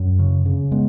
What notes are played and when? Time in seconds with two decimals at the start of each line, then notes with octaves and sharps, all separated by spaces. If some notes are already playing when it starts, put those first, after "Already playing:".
Already playing: F#2
0.19 C#3
0.46 C#3
0.71 G#3 B3